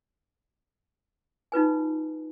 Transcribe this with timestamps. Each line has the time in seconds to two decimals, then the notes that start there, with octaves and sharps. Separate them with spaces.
1.52 D#4 F4 B4 G#5